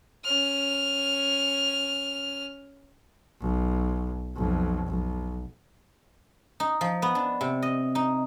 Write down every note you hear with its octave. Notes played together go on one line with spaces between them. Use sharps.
C#4 F6
B1
B1 F2
B1
D#4
F3
B3
D4
C3
D#5
D#4